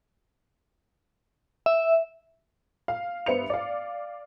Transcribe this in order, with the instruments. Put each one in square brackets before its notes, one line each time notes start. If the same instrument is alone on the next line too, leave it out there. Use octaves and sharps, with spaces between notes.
[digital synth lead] E5
[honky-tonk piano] F5
G2 B3 C5 E5 C#7 F7
D5 F5